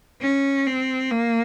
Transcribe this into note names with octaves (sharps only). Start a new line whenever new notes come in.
C#4
C4
A#3